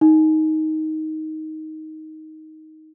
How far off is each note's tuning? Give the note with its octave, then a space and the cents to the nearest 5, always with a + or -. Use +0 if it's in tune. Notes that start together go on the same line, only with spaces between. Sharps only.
D#4 +10